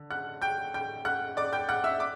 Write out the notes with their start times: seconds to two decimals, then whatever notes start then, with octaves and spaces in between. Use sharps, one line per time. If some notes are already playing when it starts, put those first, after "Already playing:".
Already playing: D3
0.10 F#5 F#6
0.42 G5 G6
0.74 G5 G6
1.05 F#5 F#6
1.37 D5 D6
1.53 G5 G6
1.69 F#5 F#6
1.84 E5 E6
2.00 D6